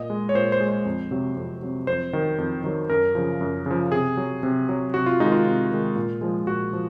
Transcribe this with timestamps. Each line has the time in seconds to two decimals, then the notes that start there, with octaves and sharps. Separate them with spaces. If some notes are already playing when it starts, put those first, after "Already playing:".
Already playing: A#2 D#5
0.10 G#3
0.29 C#5
0.35 A#2 C5
0.52 C5
0.60 G#3
0.69 C5
0.85 F2
1.11 C3 F#3
1.37 F2
1.63 C3 F#3
1.87 F2 C5
2.13 D#3 F#3
2.38 F2
2.64 D#3 F#3
2.90 F#2 A#4
3.15 C#3 F3
3.41 F#2
3.66 C#3 F3
3.92 C3 G#4
4.17 F#3
4.43 C3
4.69 F#3
4.94 C3 F#4
5.06 F4
5.20 D#3 G#3 D#4
5.32 F4
5.45 C3
5.71 D#3 G#3
5.96 A#2
6.21 F3 G#3
6.47 A#2 F#4
6.73 F3